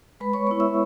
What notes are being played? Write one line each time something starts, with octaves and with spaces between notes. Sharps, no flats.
G#3 B4 B5
C#5 C#6
B3 E4 C#5 C#6
E5 E6